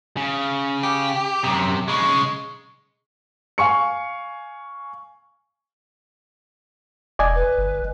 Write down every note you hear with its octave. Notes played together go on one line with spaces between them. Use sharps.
C#3
G4
F#2 C3
B1 C#3 G#3
F5 G#5 C#6 C#7
E1 D5 D#5 G#5
B4
G1